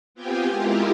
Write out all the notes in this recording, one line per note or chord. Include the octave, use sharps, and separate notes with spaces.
B3 C4 F4 G4 G5 G#5
G#3 E4 F4 G4 A#4